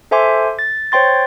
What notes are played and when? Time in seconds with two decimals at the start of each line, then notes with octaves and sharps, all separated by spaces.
0.11 A4 C5 E5 G#5 C6 D6
0.59 A6
0.92 C5 C#5 G5 C6 A6